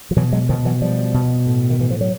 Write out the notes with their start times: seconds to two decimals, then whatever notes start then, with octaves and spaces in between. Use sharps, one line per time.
0.11 F3
0.17 B2 E3 F#3
0.32 F#3 G#3
0.49 B2 D#3 F3
0.65 E3 F#3
0.81 B2 F3 G3
1.14 B2
1.47 A2
1.70 D#3
1.79 A2 E3
1.91 F3
2.01 F#3